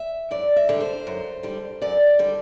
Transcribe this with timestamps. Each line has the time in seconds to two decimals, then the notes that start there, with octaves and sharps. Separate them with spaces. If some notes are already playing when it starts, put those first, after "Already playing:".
Already playing: E5
0.31 F#2 D5
0.56 E5
0.69 D3 G3
0.80 C5
1.07 F#2
1.43 D3 G3
1.82 F#2 D5
2.19 D3 G3